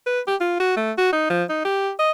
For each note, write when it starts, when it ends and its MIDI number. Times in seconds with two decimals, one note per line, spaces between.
0.06 0.20 71
0.28 0.35 67
0.40 0.56 65
0.60 0.76 66
0.77 0.92 57
0.98 1.11 66
1.12 1.29 63
1.30 1.44 53
1.50 1.61 63
1.65 1.91 67
1.99 2.11 75